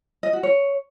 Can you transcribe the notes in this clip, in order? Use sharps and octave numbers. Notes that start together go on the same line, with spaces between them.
D#5
F#4
C#5